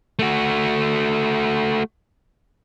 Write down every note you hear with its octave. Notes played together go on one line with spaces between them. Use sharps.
A3 F#4